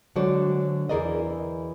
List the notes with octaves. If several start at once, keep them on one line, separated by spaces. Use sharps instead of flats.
D3 F#3 G#3 F#4 C5 D5
E2 E4 G#4 A#4 D5 D#5